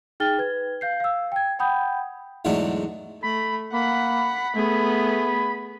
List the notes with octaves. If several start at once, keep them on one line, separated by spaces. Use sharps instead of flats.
D#4 G#4 G5 F6 A6 G7
B4 G#6
F5 G6 C7
F5 E6
G5 G#6
F#5 G5 B5 D#6 G6
E2 G#2 D3 F#3 A3 D4
A3 B5
A#3 F#5 B5
A3 B3 G#4